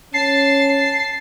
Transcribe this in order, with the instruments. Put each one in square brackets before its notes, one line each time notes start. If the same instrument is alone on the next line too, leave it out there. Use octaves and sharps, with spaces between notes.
[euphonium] C#4 [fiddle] A5 [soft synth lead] C7